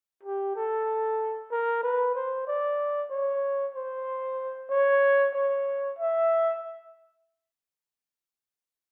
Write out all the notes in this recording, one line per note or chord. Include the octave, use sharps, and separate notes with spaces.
G4
A4
A#4
B4
C5
D5
C#5
C5
C#5
C#5
E5